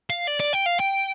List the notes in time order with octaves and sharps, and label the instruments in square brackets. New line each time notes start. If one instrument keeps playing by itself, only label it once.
[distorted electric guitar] F5
D5
D5
G5
F5
G5